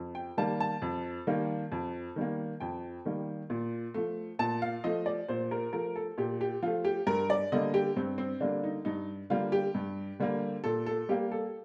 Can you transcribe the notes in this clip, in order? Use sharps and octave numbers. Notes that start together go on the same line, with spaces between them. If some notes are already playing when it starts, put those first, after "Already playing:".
Already playing: F2
G5
D#3 G3 A#3 A5
A5
F2
D#3 G3 A#3
F2
D#3 G3 A#3
F2 G5
D#3 G3 A#3
A#2
F3 A3
A#2 A5
F5
F3 A3 D#5
D5
A#2 C5
A#4
F3 A3 A#4
A4
A#2 G4
G4
F3 A3 F4
G4
G2 A#4
D5
D3 G3 A#3 D#5
G4
G2 C4
C4
D3 G3 A#3 D4
D#4
G2 D#4
D3 G3 A#3 F4
G4
G2
D3 G3 A#3
A#2 A4
A4
G3 A#3 G4
A4